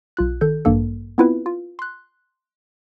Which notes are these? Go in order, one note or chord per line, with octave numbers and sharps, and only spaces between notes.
B1 F4 F#6
D#3 A4 G6
A1 G2 A#3 A4
B3 C4 E4 F4 B4
F4
C6 F#6